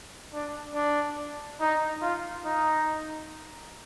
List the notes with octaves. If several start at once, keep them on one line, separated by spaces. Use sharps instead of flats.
D4
D4
D#4
F4
D#4